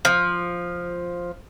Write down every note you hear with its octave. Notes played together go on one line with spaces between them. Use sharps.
F3